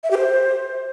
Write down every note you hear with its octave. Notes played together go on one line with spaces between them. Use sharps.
E5
G4
C5